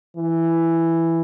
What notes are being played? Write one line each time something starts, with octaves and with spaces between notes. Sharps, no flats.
E3